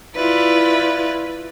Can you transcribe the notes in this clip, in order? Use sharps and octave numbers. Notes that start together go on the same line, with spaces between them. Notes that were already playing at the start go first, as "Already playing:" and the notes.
E4 F4 B4 D5